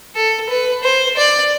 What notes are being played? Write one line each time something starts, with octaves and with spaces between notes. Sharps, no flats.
A4
B4
C5
D5